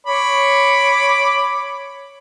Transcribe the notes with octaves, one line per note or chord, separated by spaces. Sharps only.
C#5 B5 D6